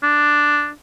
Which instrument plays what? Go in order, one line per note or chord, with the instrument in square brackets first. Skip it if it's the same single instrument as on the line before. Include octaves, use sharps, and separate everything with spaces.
[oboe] D4